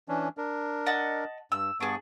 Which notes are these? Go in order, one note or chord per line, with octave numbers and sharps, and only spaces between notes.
E3 C#4 D4
D4 A#4
D#5 F#5 A5
G2 E6
G2 B3 D4 G#4 C#6